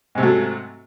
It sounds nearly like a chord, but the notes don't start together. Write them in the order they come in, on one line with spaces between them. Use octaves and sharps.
G#2 C3 A3 F#3